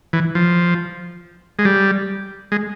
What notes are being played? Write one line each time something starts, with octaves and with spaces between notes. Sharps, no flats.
E3
F3
G#3
G3
G#3